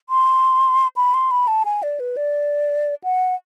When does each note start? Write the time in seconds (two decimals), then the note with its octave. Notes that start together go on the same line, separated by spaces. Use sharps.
0.09 C6
0.96 B5
1.14 C6
1.31 B5
1.47 A5
1.65 G#5
1.83 D5
2.00 B4
2.17 D5
3.04 F#5